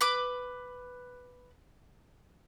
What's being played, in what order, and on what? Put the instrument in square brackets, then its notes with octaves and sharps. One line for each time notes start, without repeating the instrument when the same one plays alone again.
[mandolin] B4 B5 D6